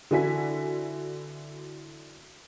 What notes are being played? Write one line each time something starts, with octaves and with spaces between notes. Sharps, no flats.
D3 E3 E4 F#4 G#5 B6